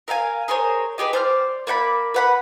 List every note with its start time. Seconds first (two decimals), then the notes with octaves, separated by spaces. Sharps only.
0.08 A#4 E5 F5 G#5
0.48 G#4 A#4 C5 C#5
0.98 D#4 G4 G#4 B4
1.13 C5 D5 F6
1.67 A#3 D5 F#5 B5
2.14 B4 F#5 B5